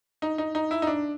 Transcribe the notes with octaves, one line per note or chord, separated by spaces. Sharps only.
D#4
D#4
D#4
E4
D#4
D4